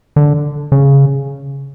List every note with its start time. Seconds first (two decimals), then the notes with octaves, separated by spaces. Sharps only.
0.16 D3
0.72 C#3